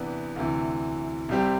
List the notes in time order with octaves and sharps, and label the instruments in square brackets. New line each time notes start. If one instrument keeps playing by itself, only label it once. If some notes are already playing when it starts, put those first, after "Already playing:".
Already playing: [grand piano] E2 C3 E3 B3 D4
D2 C3 E3
C2 C3 G3 C4 G4